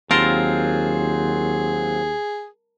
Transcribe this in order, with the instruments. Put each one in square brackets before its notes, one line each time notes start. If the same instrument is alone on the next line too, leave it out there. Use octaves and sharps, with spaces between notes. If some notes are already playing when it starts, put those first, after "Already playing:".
[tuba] D#2 [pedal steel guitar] F#3 C4 F4 [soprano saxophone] G#4 [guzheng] A#4 A5 C6